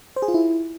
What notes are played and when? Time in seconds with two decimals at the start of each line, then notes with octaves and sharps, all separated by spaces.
0.16 C5
0.22 G#4
0.28 F4
0.34 E4